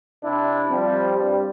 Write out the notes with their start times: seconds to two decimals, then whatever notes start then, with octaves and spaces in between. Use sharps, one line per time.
0.23 C3 D4 E4
0.70 F3 G3 C4
1.18 G2 G3